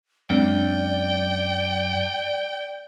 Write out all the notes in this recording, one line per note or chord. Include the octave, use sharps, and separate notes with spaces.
F#2 G#3 C4 D4 D5 G5